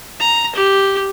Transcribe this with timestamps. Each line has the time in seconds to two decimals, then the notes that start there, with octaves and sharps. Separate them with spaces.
0.20 A#5
0.55 G4